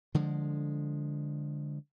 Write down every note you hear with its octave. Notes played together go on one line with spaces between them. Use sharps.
D3 F3 G#3